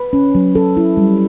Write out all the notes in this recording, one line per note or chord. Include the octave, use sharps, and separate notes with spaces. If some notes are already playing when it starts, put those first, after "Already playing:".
Already playing: B4
C#4
F#3
C#4 A4
E4
G3